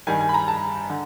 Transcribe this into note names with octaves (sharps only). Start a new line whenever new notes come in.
G2 D#3 G3 G#5
G#5
B5
A#5
A5
D3